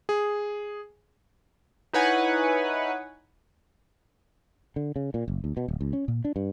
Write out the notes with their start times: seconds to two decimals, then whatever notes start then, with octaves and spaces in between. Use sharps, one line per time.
0.09 G#4
1.93 D#4 E4 B4 C#5 F#5 G#5
4.76 D3
4.96 C#3
5.14 A#2
5.28 F#1
5.44 D2
5.57 B2
5.68 D1
5.81 C#2
5.93 C#4
6.08 A#2
6.25 D4
6.36 G2